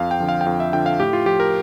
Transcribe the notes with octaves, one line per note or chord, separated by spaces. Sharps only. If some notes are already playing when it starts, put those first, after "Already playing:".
Already playing: F2 F5
G5
D3 F3
F5
G5
F2 F5
E5
D3 F3 G5
F5
A2 G4
F4
F3 G4
A#4